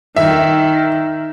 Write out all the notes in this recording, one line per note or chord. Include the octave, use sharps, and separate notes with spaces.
D#3 E5